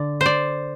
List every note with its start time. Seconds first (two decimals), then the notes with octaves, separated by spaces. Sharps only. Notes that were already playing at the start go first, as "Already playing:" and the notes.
Already playing: D3 D5
0.21 C5 D5